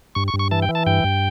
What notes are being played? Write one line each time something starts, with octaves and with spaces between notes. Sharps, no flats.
G2 C#6
C#6
G2
C#6
E3 A5
G5
E3
A5
G2 G5
G2